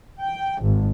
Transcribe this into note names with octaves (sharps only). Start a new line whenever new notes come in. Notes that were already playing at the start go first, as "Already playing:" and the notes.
G5
G#1